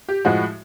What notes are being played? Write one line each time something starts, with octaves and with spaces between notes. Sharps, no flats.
G4
A2 F3 G#3 F#4